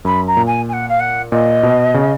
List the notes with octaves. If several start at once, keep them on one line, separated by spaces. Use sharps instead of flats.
F#2 B5
A#5
A#2
G#5
G#5
F#5
F5
F#5
A#2 D#5
B2
C#3